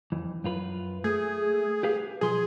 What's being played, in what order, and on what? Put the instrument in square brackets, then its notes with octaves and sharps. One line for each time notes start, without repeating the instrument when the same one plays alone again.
[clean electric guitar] F2 E3
F#2 F4 B4
[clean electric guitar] A3 [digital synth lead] G#4
[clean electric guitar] G4 B4 F5
[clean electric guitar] B1 F3 C6 [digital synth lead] G#4